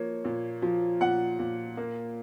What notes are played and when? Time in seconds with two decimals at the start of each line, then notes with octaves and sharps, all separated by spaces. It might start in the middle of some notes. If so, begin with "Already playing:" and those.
Already playing: F3 A#3 C#5
0.25 A#2
0.62 F3
1.01 A#2 F#5
1.39 A#2
1.77 A#3